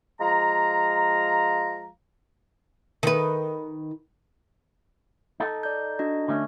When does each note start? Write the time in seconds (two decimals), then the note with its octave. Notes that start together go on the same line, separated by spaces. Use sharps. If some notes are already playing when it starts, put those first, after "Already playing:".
0.21 F3 G#3 F5 A#5
3.03 D#3 B4
5.40 D#4 A4
5.63 D5 G6
5.99 D4 F#4 D#5
6.28 D3 A3 C#4